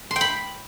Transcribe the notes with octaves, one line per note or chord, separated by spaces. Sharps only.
C6
G5
B5